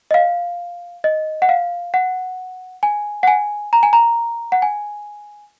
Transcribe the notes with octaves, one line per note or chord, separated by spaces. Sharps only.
D#5
F5
D#5
F#5
F5
F#5
G#5
F#5
G#5
A#5
G#5
A#5
F#5
G#5